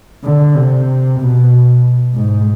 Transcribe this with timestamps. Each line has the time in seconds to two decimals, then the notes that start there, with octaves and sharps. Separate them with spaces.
0.24 D3
0.55 C3
1.19 B2
2.15 G#2